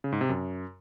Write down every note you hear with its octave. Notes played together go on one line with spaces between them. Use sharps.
C#3
G#2
C3
F#2